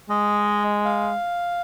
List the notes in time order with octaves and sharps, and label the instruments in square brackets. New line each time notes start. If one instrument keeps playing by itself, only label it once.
[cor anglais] G#3 [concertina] D#5
[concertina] F5